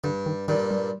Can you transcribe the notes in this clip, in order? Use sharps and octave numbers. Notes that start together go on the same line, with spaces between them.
G2 D3
D#3
G2 A#2 D#3
G3